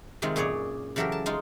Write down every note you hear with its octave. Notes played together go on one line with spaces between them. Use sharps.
C3 D#3 G#3 C4 F4
F#2 A#2 G#4 C#5 D5
C#3 E3 F#3 G4 A4 A#4
A5
G#3 D#4 F4